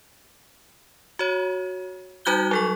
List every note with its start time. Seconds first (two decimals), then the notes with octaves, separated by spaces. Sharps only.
1.19 F#4 C#5
2.25 G3 D#4 F#4 F#6 G6 G7
2.51 F#3 A4 C#6